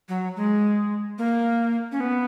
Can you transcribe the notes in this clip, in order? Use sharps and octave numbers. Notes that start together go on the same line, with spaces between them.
F#3
G#3
A#3
C#4
B3